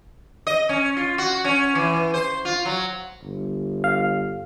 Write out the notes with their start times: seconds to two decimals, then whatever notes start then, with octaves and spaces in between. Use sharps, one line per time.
0.47 D#5
0.69 C#4
0.97 F4
1.18 F#4
1.44 C#4
1.75 E3
2.14 C5
2.45 F4
2.65 F#3
3.23 G1
3.84 F5